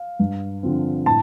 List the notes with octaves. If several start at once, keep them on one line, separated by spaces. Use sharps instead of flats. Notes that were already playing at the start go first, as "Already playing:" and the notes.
Already playing: F5
G2
D3 F3 C4
A2 A5